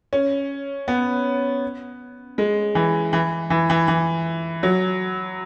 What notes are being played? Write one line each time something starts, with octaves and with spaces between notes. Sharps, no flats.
C#4
B3
G#3
E3
E3
E3
E3
E3
F#3